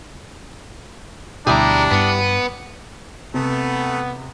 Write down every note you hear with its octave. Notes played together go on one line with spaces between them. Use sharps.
D2 B2 G3 D4 E4 G4 G#4 A#5
G2 B3
C3 A3 B3